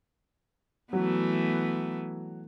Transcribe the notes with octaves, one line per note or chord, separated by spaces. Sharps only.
E3 F#3 A3 B3